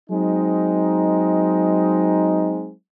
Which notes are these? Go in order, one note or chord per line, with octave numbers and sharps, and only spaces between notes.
F#3 G#3 C4 D#4